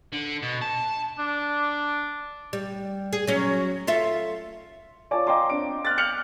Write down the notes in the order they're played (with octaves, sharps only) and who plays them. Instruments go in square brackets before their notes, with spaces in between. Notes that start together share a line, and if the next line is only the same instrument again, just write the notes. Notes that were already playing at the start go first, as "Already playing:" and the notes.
[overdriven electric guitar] D3
B2
A5
[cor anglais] D4
[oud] G3
G#4
F#3 C#4
F4 A4 E5
[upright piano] F4 C#5 D5 G#5 A5 D6
D#5 F5 G5 A#5 C6 D6
C4 D4 D7
F6 F#6 A6
F6 G6 C#7 F7 F#7